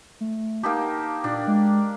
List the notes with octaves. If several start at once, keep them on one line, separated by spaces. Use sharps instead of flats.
A3
A#3 D#4 G4 A5
A#2 D4
G#3